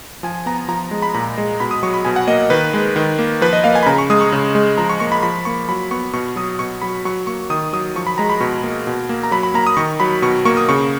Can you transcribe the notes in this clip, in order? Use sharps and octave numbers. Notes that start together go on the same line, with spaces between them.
F3 G#5
B3 A#5
F3 A#5
G#3
B5
A#2 A#5
G#3
B2 B5
D#6
F#3 C#6
B5
B2 G#5
F#5
A#3 D#5
D#3 B4
G#3
D#3
A#3
F3 B4
D#5
A#3 F5
G#5
B5
C#3 A#5
C#6
G#3 D#6
C#6
C#3
G#3
F3 A#5
C#6
A#3 C#6
B5
F3 B5
A#3 C#6
F#3 B5
B3 C#6
B2 C#6
F#3 D#6
B2 C#6
F#3 B5
F#3 C#6
A#3 C#6
D#3 D#6
F#3 D#6
F3 C#6
B5
G#3 A#5
B5
B2 C#6
A#3
B2
A#3
A#5
F#3 B5
B5
A#3 A#5
D#6
D#3 C#6
F#3 B5
B2 C#6
A#3 C#6
D#6
C#3 C#6